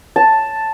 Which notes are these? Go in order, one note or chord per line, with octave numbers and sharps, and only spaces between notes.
A5